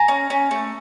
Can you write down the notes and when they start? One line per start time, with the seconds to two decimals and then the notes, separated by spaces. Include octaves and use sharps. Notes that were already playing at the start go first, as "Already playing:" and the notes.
Already playing: G#5 A#5
0.08 C#4
0.30 C#4
0.51 A3